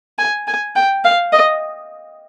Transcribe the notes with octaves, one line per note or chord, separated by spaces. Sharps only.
G#5
G#5
G5
F5
D#5